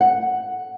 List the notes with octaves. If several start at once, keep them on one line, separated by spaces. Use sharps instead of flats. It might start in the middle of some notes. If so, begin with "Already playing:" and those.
F#5